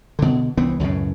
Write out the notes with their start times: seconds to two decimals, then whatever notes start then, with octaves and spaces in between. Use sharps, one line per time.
0.19 B2 D3
0.57 C2 E3 B3 C4
0.80 C#2 F#2 A2 C#3